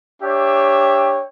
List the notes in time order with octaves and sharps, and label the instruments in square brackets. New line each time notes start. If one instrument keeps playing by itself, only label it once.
[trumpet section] D4 G4 C#5 E5 G5